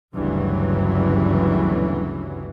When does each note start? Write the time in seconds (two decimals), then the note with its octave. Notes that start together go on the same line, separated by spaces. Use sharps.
0.14 G1 D2 G2 C#3 E3 F#3